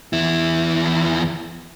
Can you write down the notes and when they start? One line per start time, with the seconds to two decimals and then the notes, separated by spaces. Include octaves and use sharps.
0.13 E2 E4